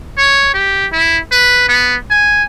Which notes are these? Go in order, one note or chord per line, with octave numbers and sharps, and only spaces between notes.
C#5
G4
E4
B4
B3
G#5